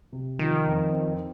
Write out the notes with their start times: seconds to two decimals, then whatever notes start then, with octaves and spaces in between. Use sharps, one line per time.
0.13 C3
0.39 D#3 F3
0.66 F2
0.92 C4